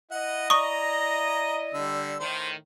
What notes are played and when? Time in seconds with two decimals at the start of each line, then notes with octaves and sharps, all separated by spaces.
0.12 E4 D#5 F#5
0.50 D5 A#5 C#6 D#6
1.74 D3 G3 E6
2.20 A2 D#3 C5